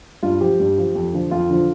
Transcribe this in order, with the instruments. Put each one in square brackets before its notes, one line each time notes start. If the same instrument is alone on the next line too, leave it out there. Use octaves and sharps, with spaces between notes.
[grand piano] G2 F4
F3 G4
G2
F3
F2
D3 F3
F2 F4
D3 F3